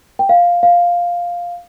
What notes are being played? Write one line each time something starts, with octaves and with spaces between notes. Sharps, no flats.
G5
F5
F5